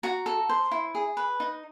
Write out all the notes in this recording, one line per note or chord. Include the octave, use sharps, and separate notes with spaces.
F#4 A#5
A4
C5
E4
G#4
B4
D#4